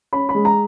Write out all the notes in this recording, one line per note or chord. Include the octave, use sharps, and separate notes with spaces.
C#4 B5
B5
G#3
A#5